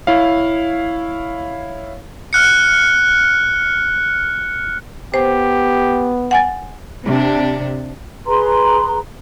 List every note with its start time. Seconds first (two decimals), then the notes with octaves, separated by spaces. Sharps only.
0.07 E4 C#5 F5
2.33 F6 F#6 C#7
5.14 B3 G4 C5
6.31 F#5 G#5 A6
7.05 C3 D4
8.27 G#4 B4 A#5 C6